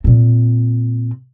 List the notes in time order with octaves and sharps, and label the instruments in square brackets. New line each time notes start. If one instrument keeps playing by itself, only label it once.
[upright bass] A#2 C4